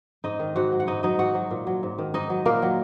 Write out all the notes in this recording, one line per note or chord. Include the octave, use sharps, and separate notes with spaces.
G#2 D#4 D#5
D#3
G#2 F#4 F#5
F#3
F#5
G#2 D#4 D#5
F#3 D#4 D#5
G#2 F#4 F#5
F#3
A#2
F#3
G#2
D#3
G#2 D#4 D#5
F#3
A#2 A#3 A#4
F#3